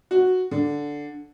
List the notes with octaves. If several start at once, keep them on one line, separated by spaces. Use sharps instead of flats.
F#4
D3